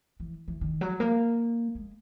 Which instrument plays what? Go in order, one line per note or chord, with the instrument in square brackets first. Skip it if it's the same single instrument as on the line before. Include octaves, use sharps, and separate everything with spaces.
[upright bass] E3
E3
D#3
F#3
A#3
G#3